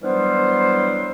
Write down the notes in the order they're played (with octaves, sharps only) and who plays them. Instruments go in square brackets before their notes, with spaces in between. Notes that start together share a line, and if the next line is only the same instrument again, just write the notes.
[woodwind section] E3 F#3 G3 B3 D4 C5